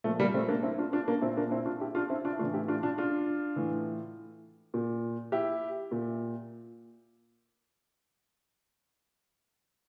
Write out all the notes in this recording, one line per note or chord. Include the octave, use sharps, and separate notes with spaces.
A#2 F3 A3
G3 A#3
A3 C4
A#3 D4
C4 E4
D4 F4
D4 F4
A#3 D4
A#2 C4 E4
A#3 D4
C4 E4
D4 F4
E4 G4
D4 F4
C4 E4
D4 F4
E4
A2 E3 D4 F4
E4 G4
D4 F4
D4 F4
D4 F4
A2 E3
A#2
E4 G4
A#2